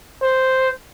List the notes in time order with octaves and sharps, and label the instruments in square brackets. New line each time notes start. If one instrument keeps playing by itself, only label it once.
[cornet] C5